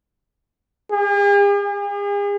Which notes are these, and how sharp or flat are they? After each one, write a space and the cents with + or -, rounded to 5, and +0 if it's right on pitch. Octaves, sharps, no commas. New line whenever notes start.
G#4 -45
G#4 -40